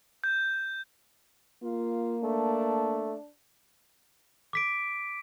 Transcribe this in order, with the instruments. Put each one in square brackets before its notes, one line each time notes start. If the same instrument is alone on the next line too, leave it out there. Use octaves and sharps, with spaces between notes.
[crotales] G6
[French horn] A#3 [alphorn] F4
[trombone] A3 [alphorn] D4
[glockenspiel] D6 B6 D7